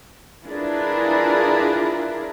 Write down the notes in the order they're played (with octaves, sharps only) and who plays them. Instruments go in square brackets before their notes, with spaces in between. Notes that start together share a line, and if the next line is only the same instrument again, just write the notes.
[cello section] D4 E4 F4 G#4 A#4 B4